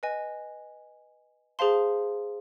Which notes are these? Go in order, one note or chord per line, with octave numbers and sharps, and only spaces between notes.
B4 D#5 G#5
G#4 C5 F5 A5 C6